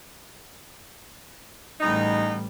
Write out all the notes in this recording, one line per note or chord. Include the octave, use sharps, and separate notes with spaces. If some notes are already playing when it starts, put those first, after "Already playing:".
A1 E2 G3 D#4